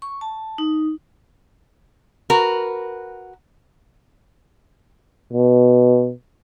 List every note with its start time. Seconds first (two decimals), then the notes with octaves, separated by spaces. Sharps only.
0.02 C#6
0.21 A5
0.58 D#4
2.30 F#4 A#4 B4
5.33 B2